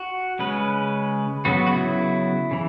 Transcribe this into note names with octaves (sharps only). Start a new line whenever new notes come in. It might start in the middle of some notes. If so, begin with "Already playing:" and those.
Already playing: F#4
C#3 G#3 C#4 B4
C#3 F#3 B3 F#4
F#4
E4
C#3 E3